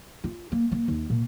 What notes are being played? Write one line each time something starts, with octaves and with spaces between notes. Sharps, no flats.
F4
A#3
A#3
D#2
A#2